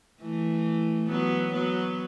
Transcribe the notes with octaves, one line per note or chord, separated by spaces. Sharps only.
E3 A3
F#3 B3
F#3 B3